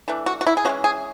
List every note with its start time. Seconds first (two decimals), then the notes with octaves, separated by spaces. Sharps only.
0.08 E3 A3 D4
0.26 F#4
0.41 F#4
0.47 E4
0.57 G#4
0.65 E3 G#3 C#4 F#4
0.84 G#4